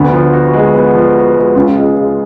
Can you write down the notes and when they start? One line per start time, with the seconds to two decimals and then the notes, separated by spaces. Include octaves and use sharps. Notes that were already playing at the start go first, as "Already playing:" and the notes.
Already playing: D2 D3 B3
0.13 F3
0.33 F#4
0.54 G#3
0.74 B3
0.95 F3
1.15 F#4
1.35 G#3
1.55 C#2 C#3 F4
1.76 G#3
1.97 G#3